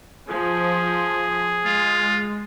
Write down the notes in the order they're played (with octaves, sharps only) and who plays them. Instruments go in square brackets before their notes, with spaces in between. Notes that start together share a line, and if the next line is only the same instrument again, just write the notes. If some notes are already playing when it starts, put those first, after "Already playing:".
[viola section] F3 [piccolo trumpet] G#4
[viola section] G#3 [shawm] F4